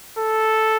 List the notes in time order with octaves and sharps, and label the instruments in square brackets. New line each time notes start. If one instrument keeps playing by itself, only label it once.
[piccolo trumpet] A4